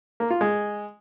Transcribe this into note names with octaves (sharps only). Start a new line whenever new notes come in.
A#3
F4
G#3